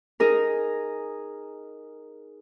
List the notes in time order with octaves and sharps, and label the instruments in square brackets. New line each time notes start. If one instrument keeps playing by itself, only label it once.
[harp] D#4 G#4 A#4